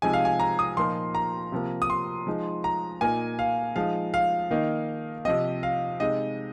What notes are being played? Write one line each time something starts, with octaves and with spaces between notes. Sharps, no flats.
C3 F3 G#3 D#4 G#5
F5
G#5
A#5
D#6
A#2 F3 A#3 D#4 C6
A#5
C3 F3 A#3
D#6
C6
F3 G#3 D#4
A#5
A#2 A#3 D#4 G#5
F5
F3 G#3 D#4 F5
F5
D#3 A#3 D#4
C3 F3 C4 D#5
F5
C3 G#3 D#4 D#5